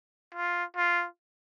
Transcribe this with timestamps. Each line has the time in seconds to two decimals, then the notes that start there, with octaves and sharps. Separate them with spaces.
0.34 F4
0.77 F4